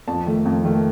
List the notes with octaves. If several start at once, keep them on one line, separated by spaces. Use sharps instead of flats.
F2 A5
D#3 A3
F2
D#3 A3